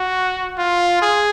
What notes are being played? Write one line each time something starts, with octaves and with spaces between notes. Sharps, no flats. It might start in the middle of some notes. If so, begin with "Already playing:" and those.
Already playing: F#4
F4
G#4